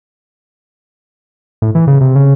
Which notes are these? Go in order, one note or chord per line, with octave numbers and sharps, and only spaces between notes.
A2
E3
C#3
C3
C#3